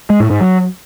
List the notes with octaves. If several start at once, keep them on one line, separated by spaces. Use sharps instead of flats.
G#3
A2
G#2
F#3